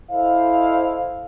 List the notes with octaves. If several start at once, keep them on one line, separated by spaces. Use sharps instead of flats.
E4 A4 C5 D#5 F5